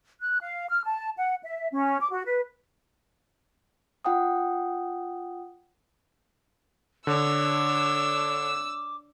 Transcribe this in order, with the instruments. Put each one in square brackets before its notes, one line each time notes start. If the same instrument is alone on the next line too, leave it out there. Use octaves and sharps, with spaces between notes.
[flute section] F#6
F5
F6
A5
F#5
E5
C#4
D6
F#4
B4
[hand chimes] F4 F#5 G5 D#6
[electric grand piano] D3 [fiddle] D4 C#5 [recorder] D6 [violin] E6